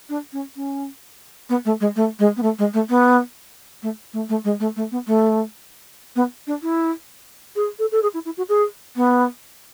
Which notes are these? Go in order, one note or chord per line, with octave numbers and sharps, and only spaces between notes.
D4
C#4
C#4
B3
A3
G#3
A3
G#3
B3
A3
G#3
A3
B3
A3
A3
A3
G#3
A3
A3
B3
A3
B3
D4
E4
G#4
A4
A4
G#4
E4
E4
F#4
G#4
B3